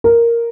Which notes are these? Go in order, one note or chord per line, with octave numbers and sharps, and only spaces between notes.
A#4